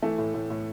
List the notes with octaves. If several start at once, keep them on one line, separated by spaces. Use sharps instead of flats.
E3 A3
A2
A2
A2